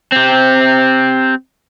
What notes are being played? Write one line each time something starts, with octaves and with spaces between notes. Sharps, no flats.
C4 G4